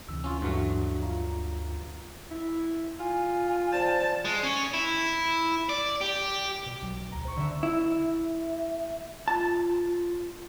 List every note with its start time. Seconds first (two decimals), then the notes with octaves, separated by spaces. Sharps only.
0.09 D2 C3 E3 E6
0.24 C#4 F4
0.42 G2 E3 F#3 A3 D4 F#4
1.03 F4 F5 A#5
2.31 E4
3.00 F4 G#5
3.73 C5 D5 A5
4.25 G#3
4.43 C#4
4.74 E4
5.69 D5
6.01 G4
6.66 B2
6.82 B1 F#3
7.12 D2 A#5
7.25 C5 C#6
7.36 D3 E5
7.63 E4
8.03 E5
9.28 F4 A5